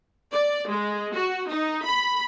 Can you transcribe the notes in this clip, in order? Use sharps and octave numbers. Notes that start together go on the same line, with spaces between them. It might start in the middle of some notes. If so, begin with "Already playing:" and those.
D5
G#3
F#4
D#4
B5